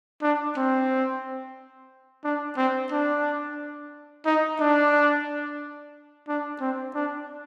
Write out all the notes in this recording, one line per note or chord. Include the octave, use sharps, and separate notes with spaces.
D4
C4
D4
C4
D4
D#4
D4
D4
C4
D4